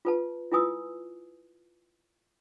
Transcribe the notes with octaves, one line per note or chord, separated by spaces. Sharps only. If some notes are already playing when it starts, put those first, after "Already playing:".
F4 B4 A5
E4 F4 B4 G#5 D#6 E6